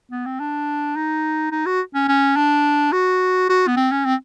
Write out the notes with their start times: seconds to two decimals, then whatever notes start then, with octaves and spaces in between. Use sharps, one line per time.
0.11 B3
0.26 C4
0.40 D4
0.96 D#4
1.52 D#4
1.66 F#4
1.94 C#4
2.08 C#4
2.36 D4
2.92 F#4
3.49 F#4
3.68 B3
3.77 C4
3.91 C#4
4.05 C4